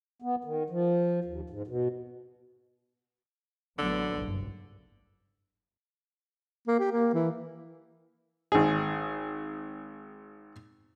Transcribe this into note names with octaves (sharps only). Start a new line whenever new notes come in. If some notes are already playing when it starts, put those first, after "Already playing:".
B3
D#3
F3
D#2
G#2
B2
A1 D3 F#3 B3
F#1 B1 G2
A#3
G4
A#3
E3
G#1 G#4